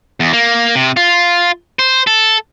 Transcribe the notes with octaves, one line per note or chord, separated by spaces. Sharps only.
E2
A#3
C3
F4
C5
A4